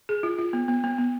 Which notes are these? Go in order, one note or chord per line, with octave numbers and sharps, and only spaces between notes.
G#4
F4
F4
B3
B3
B3
B3